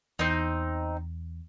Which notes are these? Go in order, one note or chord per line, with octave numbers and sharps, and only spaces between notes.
E2 C4 D#4